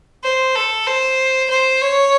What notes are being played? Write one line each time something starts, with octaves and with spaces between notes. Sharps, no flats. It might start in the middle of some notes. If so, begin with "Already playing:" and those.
C5
A4
C5
C5
C#5